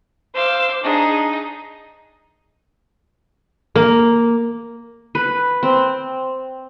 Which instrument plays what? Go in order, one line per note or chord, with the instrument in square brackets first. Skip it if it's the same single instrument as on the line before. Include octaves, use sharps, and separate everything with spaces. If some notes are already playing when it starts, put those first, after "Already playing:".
[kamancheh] C5 D6 [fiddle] F5 E6
[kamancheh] D4 G#4 [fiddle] D#4
[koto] A#3
[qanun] B4
C4